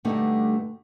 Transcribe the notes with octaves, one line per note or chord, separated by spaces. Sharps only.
D2 G2 D3 G3 A3 D#4